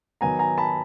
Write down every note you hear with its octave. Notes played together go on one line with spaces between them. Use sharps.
D#3 F#3 B3 G#5 A#5
G#5 A#5
A5 B5